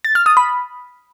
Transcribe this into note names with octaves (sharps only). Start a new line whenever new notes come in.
A6
F6
D#6
B5